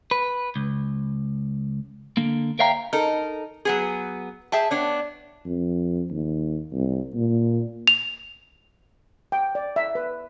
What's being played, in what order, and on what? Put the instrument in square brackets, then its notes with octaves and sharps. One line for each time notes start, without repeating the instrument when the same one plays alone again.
[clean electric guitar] B4
C#2
D3 A#3
A#4 C#5 E5 F5 G5 A#5
[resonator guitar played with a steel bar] D#4 A4 A#4
F#3 B3 G#4
G#4 E5 G5 A5
B3 D4 C#5
[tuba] F2
D#2
C2
A#2
[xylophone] F7
[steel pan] G5
D5
E5
B4